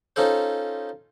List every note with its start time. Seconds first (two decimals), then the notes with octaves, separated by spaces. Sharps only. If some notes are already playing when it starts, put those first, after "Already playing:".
0.16 C#4 D#4 F4 A4 C5